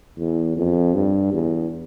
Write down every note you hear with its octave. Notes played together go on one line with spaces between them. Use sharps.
E2
F2
G2
E2